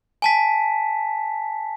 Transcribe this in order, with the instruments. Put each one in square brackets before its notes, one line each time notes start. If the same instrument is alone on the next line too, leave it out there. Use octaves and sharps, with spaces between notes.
[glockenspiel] G#5 A5 B6